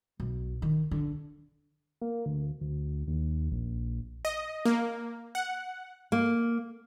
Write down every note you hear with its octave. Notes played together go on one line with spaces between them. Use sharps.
B1
D#3
D3
A#3
D2
D2
D#2
A#1
D#5
A#3
F#5
A#3